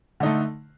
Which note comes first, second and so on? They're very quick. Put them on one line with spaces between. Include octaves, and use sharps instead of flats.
D3 D#4 A3